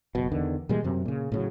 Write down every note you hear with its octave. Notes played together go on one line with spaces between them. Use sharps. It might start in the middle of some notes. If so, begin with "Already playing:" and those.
F#1 B2
E2 D3 D#3
A#2 E3 G3 G#3
F#2 C3
A#2 C#3
A2 C#3 F#3